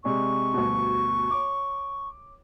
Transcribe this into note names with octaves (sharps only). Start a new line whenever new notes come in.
C3 G#3 D5 C#6
D2 G2 B2
C#5 D6